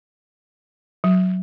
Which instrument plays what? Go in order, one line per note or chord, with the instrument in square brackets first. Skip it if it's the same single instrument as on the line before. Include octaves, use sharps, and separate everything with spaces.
[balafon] F#3